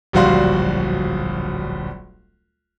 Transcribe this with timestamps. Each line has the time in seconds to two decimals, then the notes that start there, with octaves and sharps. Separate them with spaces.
0.13 D1 A#1 G3 F#4 F5 C6